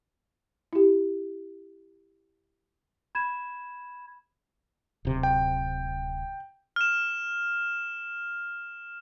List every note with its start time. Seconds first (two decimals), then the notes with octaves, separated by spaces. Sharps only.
0.73 E4 G4
3.15 B5 G#6 E7
5.05 D1 C3
5.23 G5
6.76 F6 E7